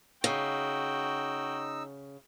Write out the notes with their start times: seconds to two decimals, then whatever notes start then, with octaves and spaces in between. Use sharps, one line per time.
0.24 C#3 D#4 F#4 G5 E6